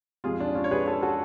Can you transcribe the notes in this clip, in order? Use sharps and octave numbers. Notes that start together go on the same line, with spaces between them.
F2 F3 G#3 F4 G#4
D4
C#4 F4
C#5
G#4 B4
A4 C#5
F#4 A4